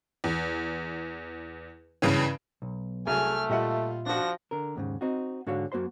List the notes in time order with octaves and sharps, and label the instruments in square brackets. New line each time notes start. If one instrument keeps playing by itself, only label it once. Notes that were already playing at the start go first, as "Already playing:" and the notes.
[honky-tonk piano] E2
G2 C#3 E3 C#4
[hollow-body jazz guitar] B1
[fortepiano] C2 F#3 E5 [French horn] A3 [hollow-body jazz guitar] G#4 [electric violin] G#5 F6
[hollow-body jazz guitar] A#2 E5 [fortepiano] G3 D#5 F#5 [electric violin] F4
[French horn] F3 [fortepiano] D4 F#4 [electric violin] A#6
[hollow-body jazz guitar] D3 A#4
D#2 G#2 C#3
C4 D#4 F#4
G#2 D3 F#4 C#5 F5
F#2 A#3 F#4 C5 C6